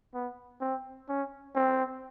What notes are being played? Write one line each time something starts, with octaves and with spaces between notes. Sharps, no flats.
B3
C4
C#4
C4